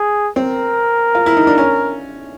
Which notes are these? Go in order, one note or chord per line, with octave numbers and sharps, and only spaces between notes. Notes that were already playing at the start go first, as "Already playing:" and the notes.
Already playing: G#4
C4 A#4
F4
E4
D#4
D4
C#4